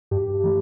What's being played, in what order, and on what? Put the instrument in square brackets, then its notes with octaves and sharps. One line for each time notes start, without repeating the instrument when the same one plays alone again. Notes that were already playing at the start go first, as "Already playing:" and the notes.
[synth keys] G2 G4
E3 A3